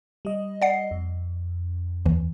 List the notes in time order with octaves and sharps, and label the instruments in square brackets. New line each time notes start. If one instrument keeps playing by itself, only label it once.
[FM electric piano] G3 D#5
[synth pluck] D5 F#5 C7
[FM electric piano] F2
[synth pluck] D#2 E3